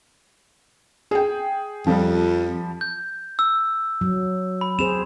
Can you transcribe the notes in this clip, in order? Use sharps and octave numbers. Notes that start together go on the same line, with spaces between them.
G#4 G5
F2 F3 G3
G6
E6
F#3
B5
C4 G#4 C5 E7 F7